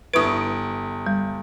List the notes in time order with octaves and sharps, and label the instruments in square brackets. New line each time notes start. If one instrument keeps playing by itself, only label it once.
[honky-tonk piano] G1 E4 D7 [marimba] B4 C#6 D#6
[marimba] G3